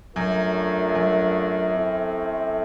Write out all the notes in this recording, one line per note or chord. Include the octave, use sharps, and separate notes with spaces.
F#2 F#3 A3 D4 F4 A#4
F#2
A3 C4 E4 A4 C5